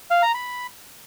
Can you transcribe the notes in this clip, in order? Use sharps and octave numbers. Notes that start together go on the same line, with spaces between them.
F5
A#5
B5